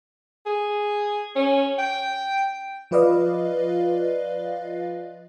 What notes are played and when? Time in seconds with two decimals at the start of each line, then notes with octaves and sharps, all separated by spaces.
0.46 G#4
1.36 C#4
1.79 G5
2.91 F3 F4 B4 D5 D#5 F5